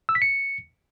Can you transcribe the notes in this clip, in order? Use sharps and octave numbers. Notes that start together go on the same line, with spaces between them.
E6
B6
C#7